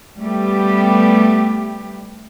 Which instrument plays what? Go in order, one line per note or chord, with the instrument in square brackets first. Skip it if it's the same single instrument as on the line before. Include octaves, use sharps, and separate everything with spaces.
[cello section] G3 A3 B3 G4